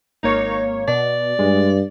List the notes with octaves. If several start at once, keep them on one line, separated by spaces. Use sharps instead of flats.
G#1 A#3 D#4 C#5
B2 D5
G2 G#3